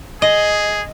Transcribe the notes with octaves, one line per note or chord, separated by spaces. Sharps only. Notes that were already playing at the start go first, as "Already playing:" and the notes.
G#4 D#5